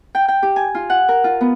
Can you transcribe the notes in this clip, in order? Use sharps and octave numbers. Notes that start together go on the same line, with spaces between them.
G5
G5
G4
G#5
F4
F#5
A#4
F4
B3